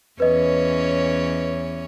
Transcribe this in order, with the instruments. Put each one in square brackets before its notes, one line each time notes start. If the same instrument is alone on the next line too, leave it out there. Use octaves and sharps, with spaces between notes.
[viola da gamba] E2 C#4 C#5 [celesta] B4 D#5